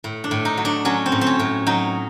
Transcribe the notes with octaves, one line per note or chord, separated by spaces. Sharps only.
A2
D4
A2
D#4
F#3
D4
F#3 C#4
C4
A2
C4
C#4
A2
F#3 D#4